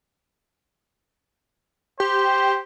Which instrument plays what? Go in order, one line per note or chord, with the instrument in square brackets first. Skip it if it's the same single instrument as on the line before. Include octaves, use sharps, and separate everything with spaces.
[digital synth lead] G4 [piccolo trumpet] C5